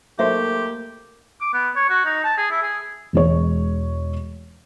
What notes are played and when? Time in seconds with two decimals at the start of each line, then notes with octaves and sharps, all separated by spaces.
0.19 B1 A3 A#3 G4 C5 E5
1.41 D6
1.54 B3
1.76 C#5
1.89 F#4
2.06 D#4
2.24 A5
2.38 G#4
2.51 E4
2.63 G#4
3.13 E1 G#3 C#5